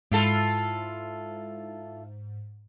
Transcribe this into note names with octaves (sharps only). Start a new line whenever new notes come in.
G#2 E4 F4 A4